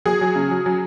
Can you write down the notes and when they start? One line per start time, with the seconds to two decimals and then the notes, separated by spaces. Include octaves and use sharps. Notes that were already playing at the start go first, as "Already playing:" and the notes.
0.05 F#3 G#4
0.21 F#3
0.35 C#3
0.51 F#3
0.66 F#3